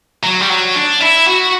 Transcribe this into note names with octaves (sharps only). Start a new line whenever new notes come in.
F#3
G3
F#3
D4
E4
F#4